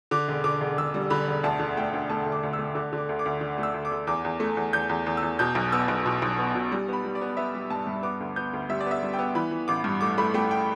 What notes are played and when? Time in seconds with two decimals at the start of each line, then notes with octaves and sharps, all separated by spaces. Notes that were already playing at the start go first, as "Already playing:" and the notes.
0.11 D3 D6
0.28 E1
0.44 D3 D6
0.61 E1
0.78 E1 E6
0.94 G3
1.10 D3 B5
1.28 E1
1.44 D2 A5
1.59 D3
1.77 A3 G5
1.94 D2
2.10 A3 A5
2.26 D2
2.32 D6
2.43 D2
2.53 E6
2.59 A3
2.75 D3 D6
2.93 D3
2.98 D6
3.09 D2
3.19 D6
3.26 D2
3.41 D3
3.58 A3
3.63 E6
3.74 D2
3.85 D6
3.91 D2
4.07 E2 D6
4.25 E2
4.40 A3
4.57 E2
4.73 E2 G6
4.89 E2
5.06 E2
5.17 E6
5.23 E2
5.39 B2 G6
5.55 B1
5.72 B3 E6
5.88 B1
6.06 B2
6.22 B1
6.39 B3
6.55 B2
6.72 G3
6.88 B3 B5
7.04 G3
7.15 D5
7.21 B3
7.37 B3 E5
7.54 G3
7.70 G2 A5
7.87 G2
8.03 B3 D6
8.20 D2
8.36 B3 G6
8.53 D2
8.69 G3 E5
8.80 D5
8.86 B3
8.91 E5
9.03 G3
9.13 G5
9.19 B3
9.35 E3 B5
9.51 E3
9.68 A1 D6
9.84 G2
10.01 A3 D6
10.18 A3 B5
10.34 A3 G5
10.51 G5